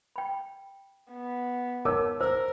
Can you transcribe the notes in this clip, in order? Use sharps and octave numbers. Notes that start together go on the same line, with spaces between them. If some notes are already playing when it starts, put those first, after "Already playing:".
G5 B5
B3
D#4 A#4 C#5 A5 D6 E6
A#4 C5 E6